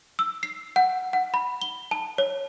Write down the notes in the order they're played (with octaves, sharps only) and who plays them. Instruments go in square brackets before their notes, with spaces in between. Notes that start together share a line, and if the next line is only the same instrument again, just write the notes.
[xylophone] E6
C7
F#5
F#5
B5
G7
A5
C#5